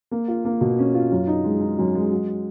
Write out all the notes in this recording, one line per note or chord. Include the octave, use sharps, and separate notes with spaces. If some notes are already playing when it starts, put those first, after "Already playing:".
A#3
F4
A#3
B2
C#4
F4
F#2
D#4
G#3
D#4
F#2
G#3
F#3